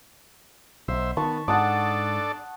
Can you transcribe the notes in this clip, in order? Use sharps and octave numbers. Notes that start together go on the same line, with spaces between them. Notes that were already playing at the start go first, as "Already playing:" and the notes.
B1 C5 E5
D#3 B3 A5 C#6
G#2 D4 A4 D5 F#5 A5 D#6